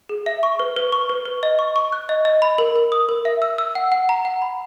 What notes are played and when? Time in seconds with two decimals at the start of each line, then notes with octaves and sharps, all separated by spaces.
0.09 G#4
0.26 E5
0.43 C#6
0.59 B4
0.76 B4
0.92 C#6
1.09 B4
1.26 B4
1.43 D#5
1.59 C#6
1.76 C#6
1.92 F#6
2.09 D#5
2.25 D#5
2.42 B5
2.58 A#4
2.76 A#4
2.92 D#6
3.09 A#4
3.25 E5
3.42 E6
3.58 E6
3.75 F#5
3.92 F#5
4.09 A#5
4.25 F#5
4.42 B5